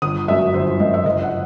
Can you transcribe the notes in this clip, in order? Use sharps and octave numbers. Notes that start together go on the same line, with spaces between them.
G1 D#6
F#2 F#3 E5
G1 C5
F#2 F#3 D#5
E5
F#1 D#5
F#5